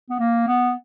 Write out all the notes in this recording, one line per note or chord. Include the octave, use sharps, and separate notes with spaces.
B3
A#3
B3